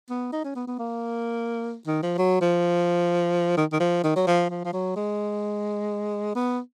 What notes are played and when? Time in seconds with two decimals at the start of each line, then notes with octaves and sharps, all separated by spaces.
0.10 B3
0.32 D#4
0.44 C#4
0.56 B3
0.67 B3
0.79 A#3
1.87 D#3
2.03 F3
2.18 F#3
2.41 F3
3.57 D#3
3.73 D#3
3.80 F3
4.04 D#3
4.16 F#3
4.27 F3
4.50 F3
4.65 F3
4.73 F#3
4.96 G#3
6.35 B3